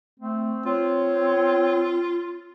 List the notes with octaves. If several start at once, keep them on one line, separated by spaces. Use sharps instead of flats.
A3 C4
C4 F4 C#5